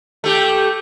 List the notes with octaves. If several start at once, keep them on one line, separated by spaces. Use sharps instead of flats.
A3 G4